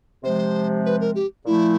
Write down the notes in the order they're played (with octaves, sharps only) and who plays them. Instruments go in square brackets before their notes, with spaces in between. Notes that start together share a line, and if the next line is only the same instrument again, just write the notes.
[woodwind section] C3 F3 G#3 [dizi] C5
[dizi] B4
A#4
G4
[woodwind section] A#2 F3 A3 [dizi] E4